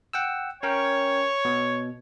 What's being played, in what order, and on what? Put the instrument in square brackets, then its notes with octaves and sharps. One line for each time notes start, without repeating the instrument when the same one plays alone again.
[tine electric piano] F#5 G5 E6
[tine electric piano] C#4 A#4 G5 [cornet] C#5
[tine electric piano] B2